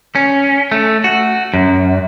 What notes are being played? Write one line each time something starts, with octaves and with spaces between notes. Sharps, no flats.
C#4
A3
F#4
F#2